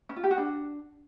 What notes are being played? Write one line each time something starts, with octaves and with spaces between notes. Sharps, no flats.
C#4
F4
G4
F#4
D4